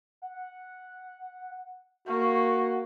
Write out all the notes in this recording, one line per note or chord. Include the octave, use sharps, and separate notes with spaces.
F#5
A#3 F#4 C#6